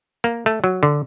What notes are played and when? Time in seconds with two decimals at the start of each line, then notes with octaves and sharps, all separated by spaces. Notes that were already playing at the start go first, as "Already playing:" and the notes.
0.24 A#3
0.46 A3
0.64 F#3
0.83 D3